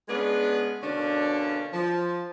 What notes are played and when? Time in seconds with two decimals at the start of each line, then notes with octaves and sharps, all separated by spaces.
0.09 G#3 B3 C#4 D4 G#4 B4
0.83 B2 D3 A#3 C#4 D4
1.73 F3